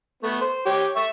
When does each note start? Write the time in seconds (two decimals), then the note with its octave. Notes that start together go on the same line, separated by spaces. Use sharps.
0.23 A3 B3
0.41 C5
0.66 G4 C#5
0.96 E5 C#6